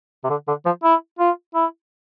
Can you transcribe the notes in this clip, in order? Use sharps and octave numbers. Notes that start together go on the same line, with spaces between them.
C3
D3
D3
F3
E4
F4
E4